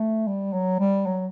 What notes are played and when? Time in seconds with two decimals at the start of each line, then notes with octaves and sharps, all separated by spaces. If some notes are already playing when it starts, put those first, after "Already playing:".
Already playing: A3
0.27 G3
0.53 F#3
0.80 G3
1.06 F#3